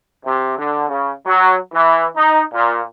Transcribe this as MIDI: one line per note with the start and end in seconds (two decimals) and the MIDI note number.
0.25 0.56 48
0.57 0.87 50
0.88 1.12 49
1.26 1.56 54
1.73 2.06 52
2.16 2.42 63
2.53 2.79 46